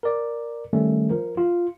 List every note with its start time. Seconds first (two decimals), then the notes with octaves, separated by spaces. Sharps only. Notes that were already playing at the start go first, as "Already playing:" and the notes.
0.03 A#4 D5
0.73 D#3 G3 A3 C#4
1.10 F3 A#4
1.37 F4